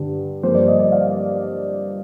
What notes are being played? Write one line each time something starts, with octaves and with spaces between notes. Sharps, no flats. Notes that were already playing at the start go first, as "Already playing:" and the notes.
Already playing: G2 D3 G3
G2 F3 A#3 C5
D5
D#5
D5
F5